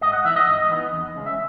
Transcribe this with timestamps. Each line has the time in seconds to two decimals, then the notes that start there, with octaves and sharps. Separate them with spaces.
0.01 G#2 D#5
0.13 F#5
0.25 E3 B3 D#4 E5
0.36 D#5
0.47 G#2
0.70 E3 B3 D#4
0.93 E2
1.15 C#3 G#3 C#4
1.26 E5